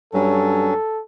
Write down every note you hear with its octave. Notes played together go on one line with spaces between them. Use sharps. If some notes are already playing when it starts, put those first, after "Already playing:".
G2 F#3 C#4 A4